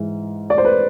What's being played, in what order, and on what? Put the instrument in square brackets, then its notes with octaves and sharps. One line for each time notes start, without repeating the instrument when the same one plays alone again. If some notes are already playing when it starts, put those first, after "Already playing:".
Already playing: [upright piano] G#2 E3
D5
C5
B4